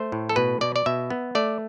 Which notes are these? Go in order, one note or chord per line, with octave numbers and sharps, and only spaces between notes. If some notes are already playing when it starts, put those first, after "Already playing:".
Already playing: A3 C5
A2
A4
B2 B4
B2 D5
D5
B2 E5
B3
A3 D5